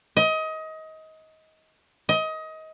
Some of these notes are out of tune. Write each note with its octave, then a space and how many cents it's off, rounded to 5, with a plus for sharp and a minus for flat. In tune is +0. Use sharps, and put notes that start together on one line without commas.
D#5 +25
D#5 +25